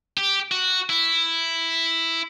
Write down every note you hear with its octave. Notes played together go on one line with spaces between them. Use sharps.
G4
F#4
E4